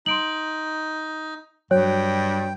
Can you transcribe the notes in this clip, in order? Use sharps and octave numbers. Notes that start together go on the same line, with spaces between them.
D#4 C6 D7 F#7
G2 F#3 C#5 G5